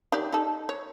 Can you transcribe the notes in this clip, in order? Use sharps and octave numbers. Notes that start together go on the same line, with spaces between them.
D#3 G4 D5
D#4 A4
C#5